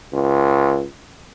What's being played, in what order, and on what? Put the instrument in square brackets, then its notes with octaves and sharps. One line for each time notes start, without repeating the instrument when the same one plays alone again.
[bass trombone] C#2